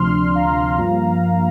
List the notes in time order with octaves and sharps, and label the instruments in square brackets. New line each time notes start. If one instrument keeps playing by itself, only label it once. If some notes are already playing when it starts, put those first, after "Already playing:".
Already playing: [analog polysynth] D2 C3 F3 D4 C6 F6
F5 A#5
G2 F3 A#3 F4